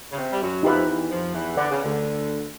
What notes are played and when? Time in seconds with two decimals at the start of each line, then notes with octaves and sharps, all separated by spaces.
0.12 C#3
0.17 C3
0.32 G3
0.41 F#2 F#3
0.63 F2 F3 D#4 G4 B4 E5
0.87 E2 E3
1.09 F2 F3
1.33 E2 E3
1.57 D3 B4 D5 F#5
1.70 C#3
1.83 D2 D3